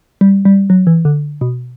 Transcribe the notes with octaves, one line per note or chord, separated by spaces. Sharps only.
G3
G3
F#3
E3
D3
B2